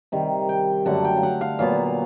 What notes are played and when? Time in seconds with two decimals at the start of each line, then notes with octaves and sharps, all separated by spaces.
0.12 C3 D#3 G3
0.49 G5
0.85 F#2 D3 F#3 A3 F#5
1.04 G5
1.17 F5
1.23 F#5
1.41 F5
1.59 A#2 F#3 B3 F5